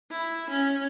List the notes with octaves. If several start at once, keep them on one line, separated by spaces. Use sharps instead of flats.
E4
C#4